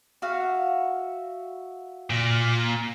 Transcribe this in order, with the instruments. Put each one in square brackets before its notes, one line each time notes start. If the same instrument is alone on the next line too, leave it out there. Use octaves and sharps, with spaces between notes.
[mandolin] F#4 E5 F5
[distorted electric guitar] A#2